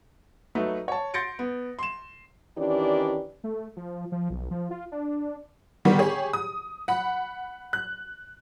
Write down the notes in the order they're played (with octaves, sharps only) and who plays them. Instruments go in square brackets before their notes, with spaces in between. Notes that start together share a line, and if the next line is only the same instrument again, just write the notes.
[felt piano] F#3 A3 D#4 B4
C#5 A5
C6 G6 A6 A#6 C#7 D7
B3
C6 E7
[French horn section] D#3 E3 C#4 D4 G4 D5
[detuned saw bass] A3
F3
F3
B1
F3
F4
D4
[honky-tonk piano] D3 D#3 G3 B3
G4 G#4 C#5
D#6
F#5 B5
F#6